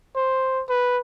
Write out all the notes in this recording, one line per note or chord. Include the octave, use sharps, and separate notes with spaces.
C5
B4